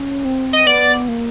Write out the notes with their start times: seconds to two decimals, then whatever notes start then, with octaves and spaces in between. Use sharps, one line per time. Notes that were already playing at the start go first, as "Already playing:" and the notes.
Already playing: C#4
0.25 C4
0.53 D#5
0.66 B3 D5
1.08 A#3